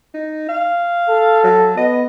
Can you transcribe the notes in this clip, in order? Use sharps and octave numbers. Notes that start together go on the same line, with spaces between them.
D#4
F5
A4
F#3
B3 D#5